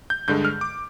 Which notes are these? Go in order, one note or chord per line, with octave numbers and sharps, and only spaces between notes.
G6
G2 D3 G#3 G6
F6
D6